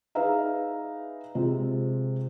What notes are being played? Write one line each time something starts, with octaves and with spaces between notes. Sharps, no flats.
D#4 G#4 B4 E5 F5 A#5
C3 G#3 F4